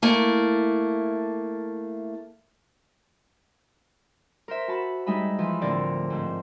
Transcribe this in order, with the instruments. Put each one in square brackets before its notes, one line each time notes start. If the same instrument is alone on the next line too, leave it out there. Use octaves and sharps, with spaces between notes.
[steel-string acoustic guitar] A3 A#3 E4
[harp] A#4 C5 E5
F#4 A5 B5
G3 G#3 D#4 E5 B5
E3 F3
D2 A2 D3 C4 A#4 D5
G#2 C4